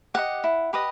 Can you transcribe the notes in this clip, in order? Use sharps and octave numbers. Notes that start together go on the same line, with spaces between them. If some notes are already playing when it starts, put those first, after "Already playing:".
G4 B4 D#5 F#5
E4
G4 B4 D#5